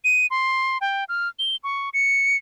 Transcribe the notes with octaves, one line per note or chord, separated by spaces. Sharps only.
D#7
C6
G5
F6
G7
C#6
C#7